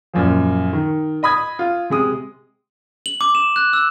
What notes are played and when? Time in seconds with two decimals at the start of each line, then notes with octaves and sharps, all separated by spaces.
0.14 F#2 A#2 F3
0.73 D#3
1.23 D#5 B5 D#6 G#6
1.59 F4
1.90 C3 G#3 D#6
3.06 F#7
3.21 D6
3.35 E7
3.56 F#6
3.73 E6